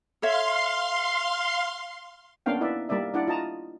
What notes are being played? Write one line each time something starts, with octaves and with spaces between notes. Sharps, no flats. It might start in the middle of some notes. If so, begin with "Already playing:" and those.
A4 C#5 E5 F5 C6
A#3 B3 C#4 D4 F5 G5
D#4 E4 B4 D5 E5
G3 A#3 D#4 D5 E5
D4 E4 D5 F#5
F4 D#5 A5 A#5